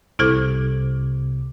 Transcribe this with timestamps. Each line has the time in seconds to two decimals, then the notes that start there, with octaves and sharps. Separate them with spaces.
0.19 C2 C3 E4 A4 C5 D6